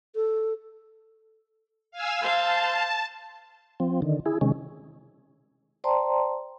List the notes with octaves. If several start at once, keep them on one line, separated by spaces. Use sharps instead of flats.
A4
F5 G#5 E6
C5 F5 A5
F3 C4
D3 D#3
E4 G#4
C3 D#3 G#3 C#4
C5 D5 G5 A5 A#5 C6